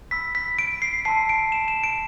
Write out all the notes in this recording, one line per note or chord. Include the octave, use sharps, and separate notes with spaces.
B5 E6 B6
B6
D7
C7
A5 C6 E6 C7
D7
E7
E7
D7